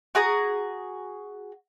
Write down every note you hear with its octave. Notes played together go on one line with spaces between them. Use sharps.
F#4 G#4 A#5 D#6